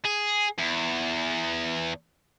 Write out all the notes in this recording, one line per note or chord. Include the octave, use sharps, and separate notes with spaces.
G#4
E2